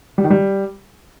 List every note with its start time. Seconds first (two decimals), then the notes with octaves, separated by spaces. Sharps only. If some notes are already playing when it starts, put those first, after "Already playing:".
0.18 G3
0.24 D#3
0.30 G3